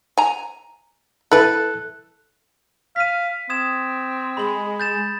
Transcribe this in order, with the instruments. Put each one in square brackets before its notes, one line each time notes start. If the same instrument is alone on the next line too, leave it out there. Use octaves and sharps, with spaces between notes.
[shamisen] G#5 A#5
[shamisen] E4 B4 [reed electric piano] A4 F#6
[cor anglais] F5 [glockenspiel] B6 D#7
[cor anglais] C4 [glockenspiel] D#6 G#6 E7
[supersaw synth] G#3 [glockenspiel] B5 F#7
[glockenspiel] G6 A6 E7